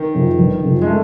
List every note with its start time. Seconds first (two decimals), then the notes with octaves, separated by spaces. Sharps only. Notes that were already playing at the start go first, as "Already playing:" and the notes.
Already playing: D#3
0.14 F#2 C#3 F3
0.39 G1
0.63 F#2 C#3 F3
0.82 G#3
0.87 A3